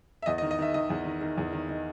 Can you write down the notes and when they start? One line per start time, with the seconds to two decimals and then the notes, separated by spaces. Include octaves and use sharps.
0.22 E5
0.26 E2 D#5
0.38 D#5
0.42 D#3
0.51 D#5
0.59 D#3 E5
0.74 D#3 D#5
0.90 E2
1.05 D#3
1.21 D#3
1.38 E2
1.53 D#3
1.69 D#3